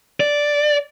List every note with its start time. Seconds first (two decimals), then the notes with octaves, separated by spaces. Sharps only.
0.20 D5